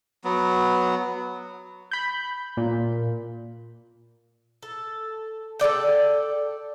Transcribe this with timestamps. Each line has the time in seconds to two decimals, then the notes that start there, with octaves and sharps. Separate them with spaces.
0.24 F#3 B3
1.91 B5 G6
2.57 A#2
4.63 A4
5.60 A4 B4 D5 G5